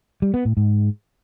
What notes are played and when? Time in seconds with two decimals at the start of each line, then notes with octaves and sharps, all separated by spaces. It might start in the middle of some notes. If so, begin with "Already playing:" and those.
0.22 G3
0.34 B3
0.45 A2
0.57 G#2